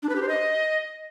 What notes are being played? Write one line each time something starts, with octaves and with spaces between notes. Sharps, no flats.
D4
B4
G4
C5
D#5